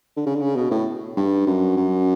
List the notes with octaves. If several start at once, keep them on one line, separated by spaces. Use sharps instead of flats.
D3
C#3
D3
C#3
B2
A2
G2
F#2
F#2